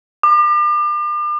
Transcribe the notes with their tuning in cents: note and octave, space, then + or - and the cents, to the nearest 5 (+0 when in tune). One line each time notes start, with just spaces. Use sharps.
D6 +40